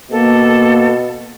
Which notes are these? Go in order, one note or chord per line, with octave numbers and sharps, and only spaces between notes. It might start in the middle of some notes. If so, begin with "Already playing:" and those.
B2 A#3 A4